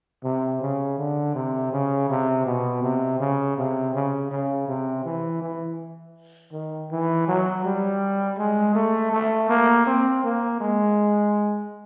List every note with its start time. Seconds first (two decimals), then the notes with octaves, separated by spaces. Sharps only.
0.24 C3
0.61 C#3
0.98 D3
1.35 C3
1.72 C#3
2.09 C3
2.46 B2
2.83 C3
3.20 C#3
3.58 C3
3.94 C#3
4.31 C#3
4.68 C3
5.05 E3
5.42 E3
6.53 D#3
6.91 E3
7.28 F#3
7.65 G3
8.38 G#3
8.75 A3
9.12 A3
9.49 A#3
9.87 C4
10.24 A#3
10.61 G#3